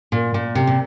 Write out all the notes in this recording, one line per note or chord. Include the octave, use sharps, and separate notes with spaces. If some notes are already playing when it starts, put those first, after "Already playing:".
A#2
A#2
C3
A#2